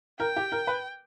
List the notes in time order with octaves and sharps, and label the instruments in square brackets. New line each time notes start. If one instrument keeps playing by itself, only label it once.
[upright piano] A#4 [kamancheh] G5
[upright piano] G4
A#4
B4